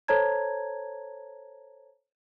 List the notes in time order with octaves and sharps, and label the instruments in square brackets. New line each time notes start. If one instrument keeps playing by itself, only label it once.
[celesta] A4 C5 C#5 A5 A#5 G#6